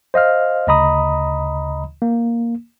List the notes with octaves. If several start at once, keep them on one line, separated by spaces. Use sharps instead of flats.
C5 D#5 F5 F6
D2 C#3 D#5 A#5 B5 D#6
A#3